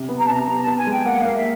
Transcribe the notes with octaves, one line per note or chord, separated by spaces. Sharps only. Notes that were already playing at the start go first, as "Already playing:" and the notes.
Already playing: C3
B3
A#5
A5
C3 A#5
B3 A#5
B3 A5
G#5
G#3 G5
A#3 F#5
F5
A#3
E5